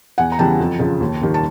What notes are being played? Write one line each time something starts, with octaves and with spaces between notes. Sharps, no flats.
E2 F#5 G#5
A#5
C#3 E3 G3 B3 G5 A5
F2
C#3 F3
D#2
D#3 G3 A#3
A5